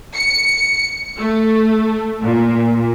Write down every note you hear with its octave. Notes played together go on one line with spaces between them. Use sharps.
C#7
A3
A#2